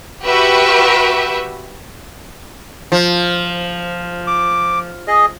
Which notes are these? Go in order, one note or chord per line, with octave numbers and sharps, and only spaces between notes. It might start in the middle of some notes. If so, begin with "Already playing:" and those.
F#4 G4 B4 E5
F3
D6
G#4 D#5